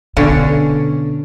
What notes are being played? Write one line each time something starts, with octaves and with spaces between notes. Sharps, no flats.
B2 D3 C#4 D4